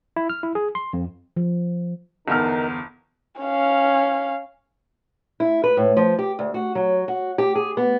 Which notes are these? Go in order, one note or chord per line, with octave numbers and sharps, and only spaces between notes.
E4
F6
E4
G#4
C6
F2
F3
G1 E2 D#3 D#4 F6
C#4 F5
E4
B4
A2
F3
G4
D2
F#4
F#3
F#4
G4
G#4
B3